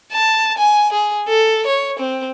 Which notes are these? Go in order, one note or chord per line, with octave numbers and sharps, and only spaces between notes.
A5
G#5
G#4
A4
C#5
C4